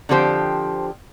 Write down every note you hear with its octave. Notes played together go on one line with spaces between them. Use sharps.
D3 F3 C4 G4 C5